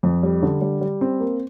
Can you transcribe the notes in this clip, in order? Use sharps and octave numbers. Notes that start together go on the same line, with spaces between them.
F2
G3
D3
G3
G3
C4
A#3